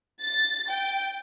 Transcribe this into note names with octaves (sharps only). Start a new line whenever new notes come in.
A6
G5